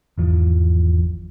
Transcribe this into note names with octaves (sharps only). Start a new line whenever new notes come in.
G#1 E2 F3